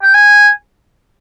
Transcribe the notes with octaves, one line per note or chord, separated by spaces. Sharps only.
G5
G#5